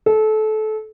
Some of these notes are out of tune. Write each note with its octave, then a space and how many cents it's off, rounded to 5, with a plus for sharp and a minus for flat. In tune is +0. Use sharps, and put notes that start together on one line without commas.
A4 -25